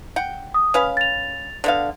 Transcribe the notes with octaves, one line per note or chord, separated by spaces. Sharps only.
F#5 G5
D#6
C#4 B4 F5
A6 F7
D3 B3 F5